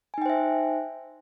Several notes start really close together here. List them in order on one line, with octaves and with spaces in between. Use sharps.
G#5 D#4 G5 C5 E5